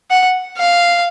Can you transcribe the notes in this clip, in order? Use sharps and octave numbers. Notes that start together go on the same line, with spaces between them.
F#5
F5